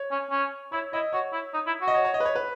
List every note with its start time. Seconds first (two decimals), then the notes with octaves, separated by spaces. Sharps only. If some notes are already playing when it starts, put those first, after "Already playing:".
Already playing: C#5
0.11 C#4
0.31 C#4
0.72 E4 C#5
0.93 E4 D#5
1.13 F#4 C#5
1.33 E4
1.54 D#4
1.67 E4
1.81 F#4
1.88 D#5
1.94 C#5
2.05 C#5
2.14 D#5
2.20 B4
2.25 C#5
2.35 B4